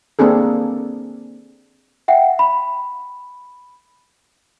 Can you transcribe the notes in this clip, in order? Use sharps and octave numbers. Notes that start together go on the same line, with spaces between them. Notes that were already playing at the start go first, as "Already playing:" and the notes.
A#3 C4 D4 G#4 A4
E5 F#5 G5
B5